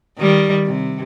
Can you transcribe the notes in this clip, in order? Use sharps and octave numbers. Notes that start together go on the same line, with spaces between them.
D#3 G3
C3